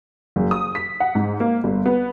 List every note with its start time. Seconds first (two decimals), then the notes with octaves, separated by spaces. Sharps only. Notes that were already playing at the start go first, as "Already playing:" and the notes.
0.36 F#1
0.51 D#6
0.75 B6
1.00 F#5
1.15 G#2
1.40 A#3
1.64 G1
1.86 B3